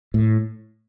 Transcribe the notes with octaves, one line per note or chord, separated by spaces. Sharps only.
A2